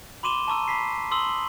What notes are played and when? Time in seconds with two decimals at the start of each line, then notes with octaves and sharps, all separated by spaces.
0.23 B5 C6 D6 D#7 E7 G7
0.48 A5 A#5 C#6 E6 D#7
0.68 B5 B6 C7
1.11 C6 D#6 E6 F#7 G7